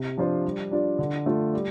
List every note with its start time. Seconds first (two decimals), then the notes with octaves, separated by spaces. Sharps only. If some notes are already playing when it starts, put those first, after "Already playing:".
Already playing: C3
0.17 F3 D4 F4 C5
0.44 G3
0.71 D4 F4 D5
0.99 D3
1.26 A3 F4
1.53 G3